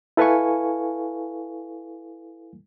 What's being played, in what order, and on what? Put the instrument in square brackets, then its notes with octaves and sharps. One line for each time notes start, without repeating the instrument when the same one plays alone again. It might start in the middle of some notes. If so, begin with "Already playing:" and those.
[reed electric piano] E4 A4 B4 F5 G#5 C#6